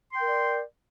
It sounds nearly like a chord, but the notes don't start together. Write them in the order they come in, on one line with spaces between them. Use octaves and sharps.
C6 G5 A#4 D5